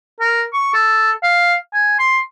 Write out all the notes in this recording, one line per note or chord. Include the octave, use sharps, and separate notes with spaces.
A#4
C#6
A4
F5
G#5
C6